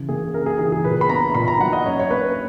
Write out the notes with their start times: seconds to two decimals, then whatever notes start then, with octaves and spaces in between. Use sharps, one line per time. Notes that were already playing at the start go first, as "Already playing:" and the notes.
Already playing: C#3 E3
0.09 A#3 G#4
0.34 C#3 A#4
0.46 G#4
0.59 E3 G#4
0.72 G#4
0.84 A#2 B4
1.01 B5
1.09 B3 A#5
1.35 A#2 B5
1.48 A#5
1.60 F#3 F#5
1.73 D#5
1.85 C#4 C#5
2.00 C#5
2.11 A#3 B4